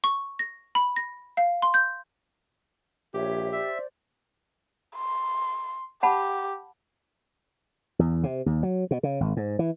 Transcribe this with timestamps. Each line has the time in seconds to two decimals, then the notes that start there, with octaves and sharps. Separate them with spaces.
0.04 C#6
0.39 A#6
0.75 B5
0.96 A#6
1.37 F5
1.62 C6
1.74 G6
3.14 A#1 G4 C#5 E5
3.52 C5 D5 E5
4.97 C6
6.03 G4 F#5 A5 B5
7.99 E2
8.23 C3
8.46 D#2
8.63 F#3
8.91 B2
9.03 C#3
9.20 G#1
9.37 G#2
9.59 E3